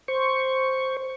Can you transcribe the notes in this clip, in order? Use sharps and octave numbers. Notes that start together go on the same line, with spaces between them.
C5 C#6